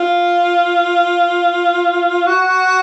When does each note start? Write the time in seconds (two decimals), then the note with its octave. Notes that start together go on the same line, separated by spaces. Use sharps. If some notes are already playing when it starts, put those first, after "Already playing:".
Already playing: F4
2.27 F#4